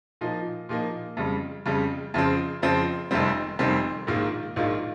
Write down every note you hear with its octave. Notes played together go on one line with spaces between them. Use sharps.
A#2 F3 A#3 D#4
A#2 F3 A#3 D#4
F2 C#3 G3
F2 C#3 G3
F2 C#3 F3 C4
F2 C#3 F3 C4
F1 F2 D#3 G3 C4
F1 F2 D#3 G3 C4
A#1 G#2 D#3 A#3 F4
A#1 G#2 D#3 A#3 F4